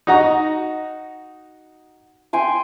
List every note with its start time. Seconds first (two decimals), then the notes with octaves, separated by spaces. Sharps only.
0.07 D#4 F#4 A#5
2.33 G5 G#5 C6